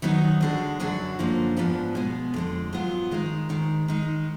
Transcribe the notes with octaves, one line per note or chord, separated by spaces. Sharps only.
F#2 D#3 F#3 B3 D#4
D3 G#3 D4 F#4
F#2 D3 F#3 D4 F#4
F#2 D3 F3 A#3 F4
G#2 F3 B3 D4
B2 G#3 B3
F2 D3 G#3
G#2 F#3 B3 F4
D#3 G#3 D#4
G#2 D#3 G#3
D#3 G#3 D#4